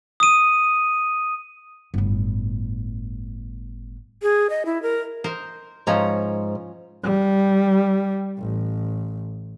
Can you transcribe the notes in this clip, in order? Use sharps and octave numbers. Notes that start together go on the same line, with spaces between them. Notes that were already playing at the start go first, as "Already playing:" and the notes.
D#6 D#7
G1 A2
G#4
D#5
E4
A#4
A#4 C5 D#5
G#2 F3 C#4 A#5
G3
A1